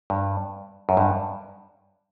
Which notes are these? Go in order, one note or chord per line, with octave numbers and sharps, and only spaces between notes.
G2
F#2
G2